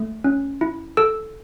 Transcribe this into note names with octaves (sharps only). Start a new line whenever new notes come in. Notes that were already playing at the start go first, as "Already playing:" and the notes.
Already playing: A3
C#4
E4
A4 E6